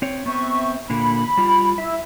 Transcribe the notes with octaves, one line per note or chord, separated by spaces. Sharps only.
C4 C#5
B3 C4 E5 C#6
A#2 D3 A#3 B5
G3 F4
E4 E5